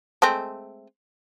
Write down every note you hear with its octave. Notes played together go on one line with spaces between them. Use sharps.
G#3 A3 C4